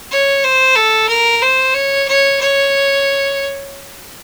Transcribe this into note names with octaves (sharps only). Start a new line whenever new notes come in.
C#5
C5
A4
A#4
C5
C#5
C#5
C#5